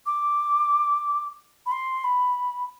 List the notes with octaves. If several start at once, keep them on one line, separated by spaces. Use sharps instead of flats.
D6
B5
C6
B5